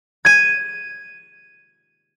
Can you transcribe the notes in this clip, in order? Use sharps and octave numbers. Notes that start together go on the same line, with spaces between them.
G#6 D#7